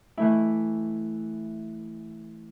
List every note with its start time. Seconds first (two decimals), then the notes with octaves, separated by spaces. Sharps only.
0.17 E3 A3 E4